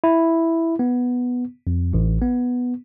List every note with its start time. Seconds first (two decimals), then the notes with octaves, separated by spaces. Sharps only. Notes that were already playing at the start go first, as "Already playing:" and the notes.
0.04 E4
0.79 B3
1.67 F2
1.93 A1
2.22 B3